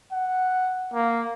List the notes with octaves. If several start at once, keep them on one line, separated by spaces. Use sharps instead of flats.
F#5
A#3